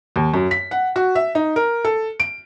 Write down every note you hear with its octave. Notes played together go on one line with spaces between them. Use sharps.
D#2
F#2
B6
F#5
F#4
E5
D#4
A#4
A4
D7